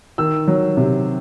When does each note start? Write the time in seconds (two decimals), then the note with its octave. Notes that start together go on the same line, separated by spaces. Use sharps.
0.18 D#3 E6
0.48 F#3
0.77 C3